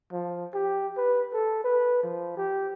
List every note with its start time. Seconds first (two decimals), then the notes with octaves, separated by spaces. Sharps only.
0.12 F3
0.54 G4
0.97 B4
1.34 A4
1.64 B4
2.04 F3
2.37 G4